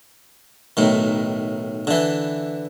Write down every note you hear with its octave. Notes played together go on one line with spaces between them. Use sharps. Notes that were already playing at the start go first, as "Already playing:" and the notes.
B1 A2 D#3
D3 E3